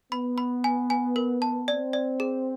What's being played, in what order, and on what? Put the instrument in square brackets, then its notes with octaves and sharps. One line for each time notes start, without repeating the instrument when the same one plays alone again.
[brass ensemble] B3 [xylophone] B5
[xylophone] B5
G#5
G#5
A#4
A5
[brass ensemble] C4 [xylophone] D5
[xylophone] D5
G#4